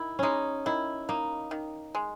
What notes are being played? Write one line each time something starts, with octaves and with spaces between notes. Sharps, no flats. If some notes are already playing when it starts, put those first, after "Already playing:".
Already playing: D#3 E4
G#3 C#4 D#4
D#3 E4
A#3 D#4
D#3
G#3